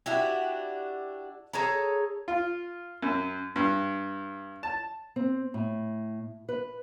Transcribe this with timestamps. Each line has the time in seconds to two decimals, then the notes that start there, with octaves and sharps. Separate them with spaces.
0.06 D4 E4 F#4 G4
1.53 G#4 A4 C#5 A#5
2.28 F4
3.02 F#2
3.56 G2
4.63 A5
5.16 C4
5.54 A2
6.49 B4